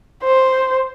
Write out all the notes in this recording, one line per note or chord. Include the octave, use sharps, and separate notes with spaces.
C5